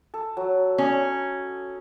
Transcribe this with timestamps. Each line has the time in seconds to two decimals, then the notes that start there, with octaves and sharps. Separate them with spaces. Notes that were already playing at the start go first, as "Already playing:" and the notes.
0.14 A4
0.37 F#3
0.78 C#4 D#5